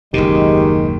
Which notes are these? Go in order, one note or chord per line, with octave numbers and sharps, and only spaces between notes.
F#1 D#2 B2 D#3 G#3 G4